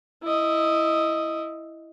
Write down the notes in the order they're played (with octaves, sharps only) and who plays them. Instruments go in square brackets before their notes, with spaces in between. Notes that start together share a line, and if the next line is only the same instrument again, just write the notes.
[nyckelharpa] E4 D#5